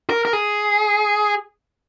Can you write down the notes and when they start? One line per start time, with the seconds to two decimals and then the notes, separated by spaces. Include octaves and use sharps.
0.10 A#4
0.25 A#4
0.33 G#4